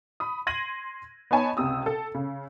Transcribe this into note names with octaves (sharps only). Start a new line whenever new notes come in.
B5 D#6
C6 G#6 A#6 D#7 F#7
B3 D#4 C#5 G#5 A5 B5
C#2 C3 D#6 E6
A4
C#3